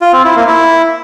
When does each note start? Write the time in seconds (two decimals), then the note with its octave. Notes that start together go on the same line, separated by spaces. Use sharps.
0.01 F4
0.13 C4
0.24 E4
0.36 A#3
0.47 E4